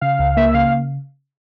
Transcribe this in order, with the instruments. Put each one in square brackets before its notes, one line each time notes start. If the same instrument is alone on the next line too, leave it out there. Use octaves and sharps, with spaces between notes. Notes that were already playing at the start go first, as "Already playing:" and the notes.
[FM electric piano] C#3 [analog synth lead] F5
[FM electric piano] C#2
[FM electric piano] A#3 [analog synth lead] E5
[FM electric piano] C#3 [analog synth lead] F5